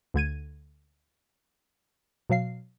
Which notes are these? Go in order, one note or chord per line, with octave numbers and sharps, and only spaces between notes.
D2 D3 G#6 D#7
B2 F#3 F5 C7